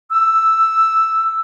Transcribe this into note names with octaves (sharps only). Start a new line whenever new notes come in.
E6